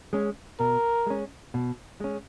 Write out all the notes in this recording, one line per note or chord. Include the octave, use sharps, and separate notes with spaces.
G#3 C#4
B2 A#4
G#3 C#4
B2
G#3 C#4